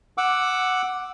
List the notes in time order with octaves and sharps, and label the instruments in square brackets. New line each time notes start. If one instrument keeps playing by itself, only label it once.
[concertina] F#5 D6 E6